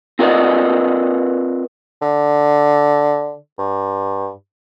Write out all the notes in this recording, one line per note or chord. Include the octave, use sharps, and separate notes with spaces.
C4 F4 A#4 B4 D5 D#5
D3
G2